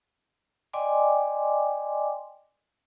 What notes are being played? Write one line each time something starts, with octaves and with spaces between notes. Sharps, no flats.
D5 D#5 G5 G#5 C6 D6